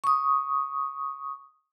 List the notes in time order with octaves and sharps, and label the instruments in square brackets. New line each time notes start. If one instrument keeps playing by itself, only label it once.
[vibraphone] C#6 D#6